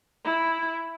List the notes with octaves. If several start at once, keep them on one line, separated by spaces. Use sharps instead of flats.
E4